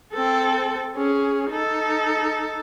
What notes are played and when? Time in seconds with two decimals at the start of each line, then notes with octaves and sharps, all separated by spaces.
0.13 C4 A4
0.95 C#4 G#4
1.50 D#4 A4